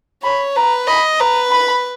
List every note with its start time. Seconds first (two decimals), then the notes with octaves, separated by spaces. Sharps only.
0.23 C#5 B5
0.56 B4 A#5
0.87 D#5 B5
1.20 B4 A#5
1.51 B5